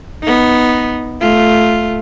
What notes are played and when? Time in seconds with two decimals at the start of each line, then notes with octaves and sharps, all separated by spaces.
0.22 B3 D#4
1.20 A3 F4